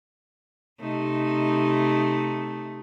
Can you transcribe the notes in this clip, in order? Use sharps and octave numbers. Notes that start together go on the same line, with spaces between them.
C3 A3 D#4